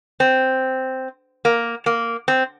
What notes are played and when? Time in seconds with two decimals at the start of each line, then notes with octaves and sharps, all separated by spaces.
0.20 C4
1.45 A#3
1.86 A#3
2.28 C4